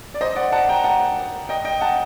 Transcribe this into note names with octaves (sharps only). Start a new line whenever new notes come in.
D5
C5 D#5
D5 F#5
F#5 A5
G5 A#5
F#5 A5
D#5 G5
D#5 G5
F#5 A5